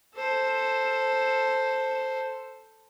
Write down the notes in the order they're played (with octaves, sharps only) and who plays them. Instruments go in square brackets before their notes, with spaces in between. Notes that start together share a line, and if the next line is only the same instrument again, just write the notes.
[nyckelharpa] A4 C5